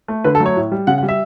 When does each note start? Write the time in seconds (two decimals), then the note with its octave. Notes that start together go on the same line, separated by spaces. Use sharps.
0.08 A3
0.24 D3 B4
0.35 A4
0.40 F#3 A3
0.46 C#5
0.57 A2
0.72 G3
0.87 C#3 F#5
0.98 F#5
1.03 G3
1.09 E5